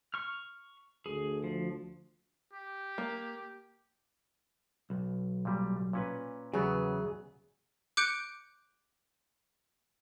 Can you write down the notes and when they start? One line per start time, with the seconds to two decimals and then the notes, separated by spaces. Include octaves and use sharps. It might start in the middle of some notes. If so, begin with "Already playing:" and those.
0.14 C#6 F6
1.06 D2 G#4
1.44 F3
2.53 G4
2.98 A#3
4.90 B1
5.45 A#2 G3
5.93 A#2 C#4 B4
6.53 E2 C#3 F#3 B3 G#4
7.97 D6 F#6 G6 C#7 D7